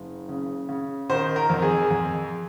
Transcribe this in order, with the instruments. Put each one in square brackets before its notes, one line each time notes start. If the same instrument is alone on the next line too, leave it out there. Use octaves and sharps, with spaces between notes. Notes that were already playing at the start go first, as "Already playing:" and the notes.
Already playing: [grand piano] F#1
C#3
C#3
D#3 C5
A#4
F2
G#4
F2